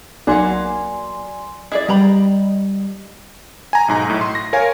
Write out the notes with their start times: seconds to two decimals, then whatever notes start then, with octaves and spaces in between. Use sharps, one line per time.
0.27 B1 F#3 A#3 D5 F#5 G#5 C6
1.71 E4 G#4 D5 D#5
1.89 G3 G5 A#5 B5
3.73 G#5 A#5
3.88 B1 G#2 A#5
4.07 B1 A2
4.21 C6
4.35 A#6
4.53 A#4 C#5 F5 G#5